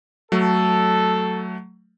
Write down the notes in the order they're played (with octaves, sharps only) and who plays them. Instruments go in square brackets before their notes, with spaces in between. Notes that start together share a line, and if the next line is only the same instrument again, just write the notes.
[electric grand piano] F#3 A3 [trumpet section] A4